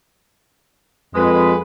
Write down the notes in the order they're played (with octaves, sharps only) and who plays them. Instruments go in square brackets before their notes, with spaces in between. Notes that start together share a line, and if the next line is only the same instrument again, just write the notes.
[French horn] F2 [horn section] G#3 B4